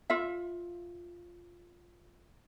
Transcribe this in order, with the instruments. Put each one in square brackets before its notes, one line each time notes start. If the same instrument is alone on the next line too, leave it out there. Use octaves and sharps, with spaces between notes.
[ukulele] F4 E5